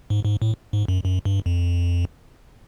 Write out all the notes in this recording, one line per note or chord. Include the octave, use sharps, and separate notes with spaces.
G#2
G#2
A2
G#2
F#2
F#2
G2
F2